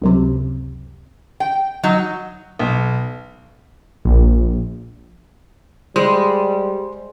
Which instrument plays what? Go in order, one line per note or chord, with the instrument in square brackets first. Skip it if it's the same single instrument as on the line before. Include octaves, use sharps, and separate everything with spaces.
[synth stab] C#2 F#2 C3
[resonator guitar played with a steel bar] G5
F#3 D#4
[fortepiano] B1
[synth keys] A#1
[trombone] G3 [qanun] G#3 [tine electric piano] C5